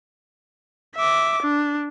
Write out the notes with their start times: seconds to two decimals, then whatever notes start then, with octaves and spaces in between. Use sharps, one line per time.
0.96 E5 D6
1.43 D4